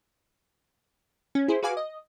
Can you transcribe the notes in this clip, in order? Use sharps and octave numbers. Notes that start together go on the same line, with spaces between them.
C#4
E4 G#4 C5
F#4 G#4 B4 F5 G#5 D6
D#5